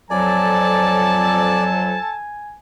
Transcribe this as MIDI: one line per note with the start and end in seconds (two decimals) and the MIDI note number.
0.11 1.97 41
0.11 1.97 54
0.11 2.17 69
0.11 1.64 74
0.11 2.55 80
0.11 2.17 81